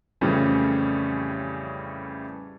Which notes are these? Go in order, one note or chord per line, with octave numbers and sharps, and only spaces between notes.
F2 A2 C#3 E3 G3 C#4